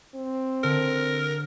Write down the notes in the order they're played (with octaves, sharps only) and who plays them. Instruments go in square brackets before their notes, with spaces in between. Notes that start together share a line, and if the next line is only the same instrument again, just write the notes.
[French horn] C4
[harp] D3 [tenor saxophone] A#4